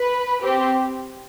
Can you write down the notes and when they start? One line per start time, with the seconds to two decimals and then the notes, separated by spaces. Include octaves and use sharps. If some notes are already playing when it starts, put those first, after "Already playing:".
Already playing: B4
0.43 C4 G4